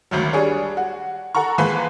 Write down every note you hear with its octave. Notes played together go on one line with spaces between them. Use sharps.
G#1 D2 D#3 F#3
G3 D4 G#4 C#5
F#4
A4 F#5 A#5 C#6
E3 F3 G#3 A#3 B4